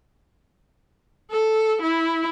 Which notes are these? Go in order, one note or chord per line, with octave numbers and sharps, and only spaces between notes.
A4
E4